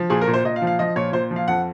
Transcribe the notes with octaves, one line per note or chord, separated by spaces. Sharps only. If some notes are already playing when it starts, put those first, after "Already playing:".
Already playing: F3
A#2 G#4
A#4
A#2
C5
A#2 D#5
F5
F3
F5
F3 D#5
A#2 C#5
A#2 C5
F3
F5
F2 F#5